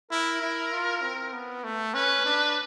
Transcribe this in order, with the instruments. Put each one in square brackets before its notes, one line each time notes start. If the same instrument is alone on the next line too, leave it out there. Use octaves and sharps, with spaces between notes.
[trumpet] E4 [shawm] A#4
[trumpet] E4
F4
C4
B3
A3
[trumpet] C#4 [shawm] B4
[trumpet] D4